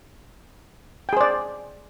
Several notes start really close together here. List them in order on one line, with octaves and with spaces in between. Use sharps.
G5 G#4 C5 D5